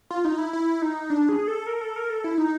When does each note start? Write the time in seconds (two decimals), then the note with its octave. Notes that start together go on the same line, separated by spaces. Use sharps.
0.10 F4
0.25 D#4
0.38 E4
0.53 E4
0.82 D#4
1.10 D4
1.29 G#4
1.48 A4
1.67 A#4
1.81 A4
1.96 A#4
2.10 A4
2.24 E4
2.38 D#4